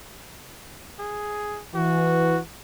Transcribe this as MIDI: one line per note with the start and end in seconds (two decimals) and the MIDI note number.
0.99 1.61 68
1.75 2.39 52
1.75 2.40 66